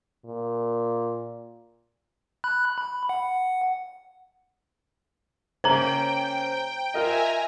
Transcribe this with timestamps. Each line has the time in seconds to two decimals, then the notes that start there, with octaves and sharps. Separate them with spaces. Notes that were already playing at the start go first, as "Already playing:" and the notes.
0.25 A#2
2.44 B5 F#6
2.78 B5
3.09 F#5
5.64 C#3 A#3 C#4 C5 G5 A#5
6.94 F4 A#4 D#5 E5 G#5 A#5